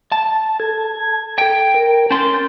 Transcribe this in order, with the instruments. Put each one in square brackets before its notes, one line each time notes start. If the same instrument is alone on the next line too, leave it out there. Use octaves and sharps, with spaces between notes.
[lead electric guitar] A5
[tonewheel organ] A4 G#6
[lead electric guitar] G5
[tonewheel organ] A#4
[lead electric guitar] C#4 C6 [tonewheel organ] G6 A6